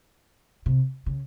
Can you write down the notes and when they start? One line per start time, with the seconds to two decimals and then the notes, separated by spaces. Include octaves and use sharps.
0.66 C3
1.06 C#3